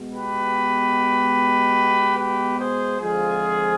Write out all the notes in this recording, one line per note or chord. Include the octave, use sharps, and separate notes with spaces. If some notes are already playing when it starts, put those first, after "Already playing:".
Already playing: B2 G#3 B3
G4 B4
G4 B4
G#4 C5
D3 F3 G#3 C4 F4 G#4